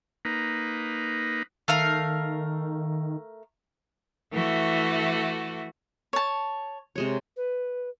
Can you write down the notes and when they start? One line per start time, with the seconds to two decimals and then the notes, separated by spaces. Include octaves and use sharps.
0.25 A#3 D#4 B4
1.68 D#3 A3 A#4 F5
4.33 E3 A3 F#4
6.13 C#5 A5
6.96 C3 G#3 C#5
7.36 B4